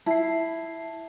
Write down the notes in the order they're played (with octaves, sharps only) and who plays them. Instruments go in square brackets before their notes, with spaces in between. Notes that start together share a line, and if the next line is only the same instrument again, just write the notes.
[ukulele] E4 [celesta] A5 C7